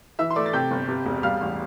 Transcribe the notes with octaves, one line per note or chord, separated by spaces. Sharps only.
E3 E5 E6
C6
A3 D5 D6
A6
C3 G5 G6
G1
C3
E1
G3 F5 F6
A1